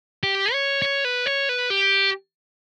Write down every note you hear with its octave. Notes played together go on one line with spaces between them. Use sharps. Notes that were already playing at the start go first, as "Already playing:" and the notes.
G4
C#5
C#5
B4
C#5
B4
G4